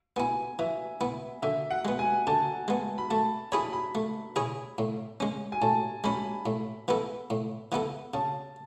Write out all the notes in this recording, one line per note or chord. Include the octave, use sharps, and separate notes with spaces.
B3 E4 G#5
E3 E5
B3 E4
D3 E5
F#5
G#3 B3
G#5
D3 A5
G#3 B3
B5
A3 A5
E4 G#4 C#5 B5
B5
A3
E4 G#4 C#5
A2
G#3 C#4
G#5
A2 A5
G#3 C#4 B5
A2
E3 B3 E4 A4
A2
E3 B3 E4 A4
C#3 A5